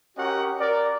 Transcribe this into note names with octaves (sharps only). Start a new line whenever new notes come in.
C#4 F#4 G4 A#4 D#5 F#5
A#4 D5